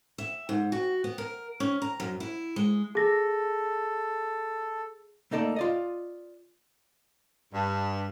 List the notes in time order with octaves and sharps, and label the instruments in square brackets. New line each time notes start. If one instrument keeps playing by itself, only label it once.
[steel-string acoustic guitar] E5
G#2
F#4
B3
A#4
C#4
A#5
F#2
E4
G#3
[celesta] G#4 A#6 [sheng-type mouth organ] A4
[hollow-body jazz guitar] A3 A#3 D#4 A4 D5
F4 D5 D#5
[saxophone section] G2